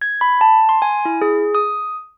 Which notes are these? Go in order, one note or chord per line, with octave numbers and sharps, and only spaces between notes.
G#6
B5
A5
C6
G#5
E4
G#4
D#6